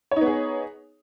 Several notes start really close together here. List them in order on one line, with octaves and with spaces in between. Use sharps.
C#5 D#4 B3 G#4